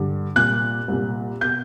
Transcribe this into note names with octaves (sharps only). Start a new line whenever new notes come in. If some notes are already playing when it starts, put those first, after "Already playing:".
Already playing: G2 D3
C2 A#2 F#6
C2 A#2
B2 G6